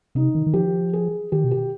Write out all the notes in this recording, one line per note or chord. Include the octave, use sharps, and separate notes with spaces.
C3 D#4
D#3
D#3
F3 G4
G#4
D#3 G4
B2
G4